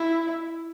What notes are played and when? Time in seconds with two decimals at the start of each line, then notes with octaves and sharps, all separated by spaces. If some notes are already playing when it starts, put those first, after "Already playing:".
Already playing: E4